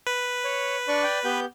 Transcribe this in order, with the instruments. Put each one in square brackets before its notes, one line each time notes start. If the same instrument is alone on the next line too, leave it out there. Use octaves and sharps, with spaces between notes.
[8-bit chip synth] B4
[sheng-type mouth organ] C#5
D4 D5 C#6
D5 G5
B3 G4 G6